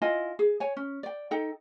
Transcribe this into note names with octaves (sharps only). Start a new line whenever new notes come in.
E4 F4 D#5 G#5
G#4
C#5 G#5
C#4
D5 G5
D#4 A4 G5